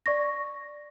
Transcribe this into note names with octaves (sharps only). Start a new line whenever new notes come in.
D5 C#6 A#6